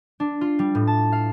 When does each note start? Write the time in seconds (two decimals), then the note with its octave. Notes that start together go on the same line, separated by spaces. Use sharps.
0.20 D4
0.41 F4
0.59 G3
0.75 A2
0.87 A5
1.12 F5